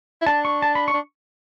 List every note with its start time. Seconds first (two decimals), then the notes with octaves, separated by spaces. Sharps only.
0.22 E4
0.26 D4 A5
0.45 C#6
0.62 A5
0.75 B5
0.88 C#6
0.94 D4